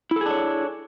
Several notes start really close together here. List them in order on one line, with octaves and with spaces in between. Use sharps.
E4 A4 G#4 D4 C#5